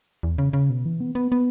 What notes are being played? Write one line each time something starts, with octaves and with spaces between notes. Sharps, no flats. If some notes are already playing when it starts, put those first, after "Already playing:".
E2
C#3
C#3
B2
E3
B3
B3
B3